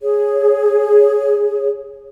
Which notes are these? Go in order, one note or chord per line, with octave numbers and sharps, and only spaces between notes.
G#4 C#5